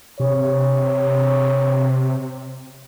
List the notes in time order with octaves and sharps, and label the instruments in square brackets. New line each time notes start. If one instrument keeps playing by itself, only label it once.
[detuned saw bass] C3 [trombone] C#5